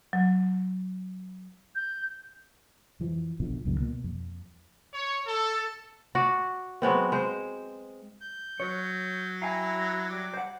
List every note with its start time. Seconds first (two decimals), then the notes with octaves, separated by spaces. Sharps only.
0.13 F#3
1.75 G6
3.00 F2 E3 F3
3.40 A#1 B2 D3 F3
3.65 C#2 F#2 A#2 D#3
3.80 B2 A#3
4.04 F2
4.94 C#5
5.27 A4
6.15 F#4 D5
6.82 F#3 G#3 B3 C4
7.12 G#3 C5
8.21 G6
8.60 F#3 C#5
9.42 E4 F5 G5 G#5 A#5
10.10 G3 D6
10.34 C5 F#5